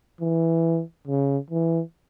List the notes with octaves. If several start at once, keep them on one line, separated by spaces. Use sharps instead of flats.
E3
C#3
E3